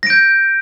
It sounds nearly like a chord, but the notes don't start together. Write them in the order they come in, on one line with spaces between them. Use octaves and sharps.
A#6 D7 G6